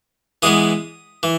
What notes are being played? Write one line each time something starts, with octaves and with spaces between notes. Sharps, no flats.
E3 G#3 B3 D#6
E3